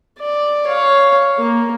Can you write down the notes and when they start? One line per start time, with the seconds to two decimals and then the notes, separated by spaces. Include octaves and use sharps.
0.19 D5
0.66 C#5 F5
1.39 A#3